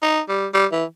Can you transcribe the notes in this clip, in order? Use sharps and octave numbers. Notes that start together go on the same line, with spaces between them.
D#4
G3
G3
E3